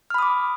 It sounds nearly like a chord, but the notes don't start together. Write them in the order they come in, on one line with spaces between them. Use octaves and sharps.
F6 B5 D#6 D6